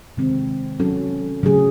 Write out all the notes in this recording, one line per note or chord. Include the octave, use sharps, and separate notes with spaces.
C3 D#3 G#3 C4
F#3 C#4 F#4 A4
C#3 F#3 A3 C#4 G#4